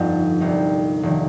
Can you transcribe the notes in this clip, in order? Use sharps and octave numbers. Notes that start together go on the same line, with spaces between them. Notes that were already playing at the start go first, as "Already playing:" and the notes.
Already playing: G1 F2 F3 D#4
C2 C3 G3 D#4
F1 D#3